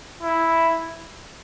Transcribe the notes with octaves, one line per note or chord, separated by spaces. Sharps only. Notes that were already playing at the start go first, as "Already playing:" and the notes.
E4